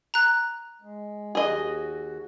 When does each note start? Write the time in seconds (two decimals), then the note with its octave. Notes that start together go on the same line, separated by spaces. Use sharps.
0.14 A#5 F#6
0.82 G#3
1.35 D#2 F#4 G#4 D#5